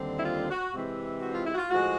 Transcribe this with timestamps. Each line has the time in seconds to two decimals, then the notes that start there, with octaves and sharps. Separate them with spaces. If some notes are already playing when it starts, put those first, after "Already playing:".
Already playing: D#2 D3 G3 C4
0.19 E4
0.25 F4
0.50 F#4
0.74 C3 E3 G#3 C4
1.22 F#4
1.34 F4
1.46 E4
1.54 F#4
1.58 F4
1.70 A2 F3 G#3 F#4